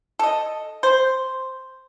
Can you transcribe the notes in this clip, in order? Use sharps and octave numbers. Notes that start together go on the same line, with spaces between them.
A4 D#5
C5